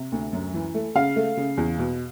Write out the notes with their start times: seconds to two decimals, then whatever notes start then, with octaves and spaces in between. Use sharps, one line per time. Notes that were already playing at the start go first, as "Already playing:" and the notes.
Already playing: C3
0.12 D2
0.33 F#2
0.54 E3
0.74 A3
0.95 C#3 F5
1.16 A3
1.37 C#3
1.57 E2
1.78 B2